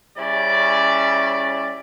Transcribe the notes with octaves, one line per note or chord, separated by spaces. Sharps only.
C#3 G3 C#4 E4 D5